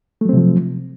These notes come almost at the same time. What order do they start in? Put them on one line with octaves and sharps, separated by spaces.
A3 F#3 C4 C3 F3